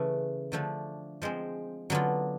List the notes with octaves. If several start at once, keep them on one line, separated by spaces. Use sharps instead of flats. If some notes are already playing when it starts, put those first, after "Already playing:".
Already playing: C#3 E3 A3
D3 F3 A3 D4
F3 G#3 C4
D3 F#3 B3 D4 F4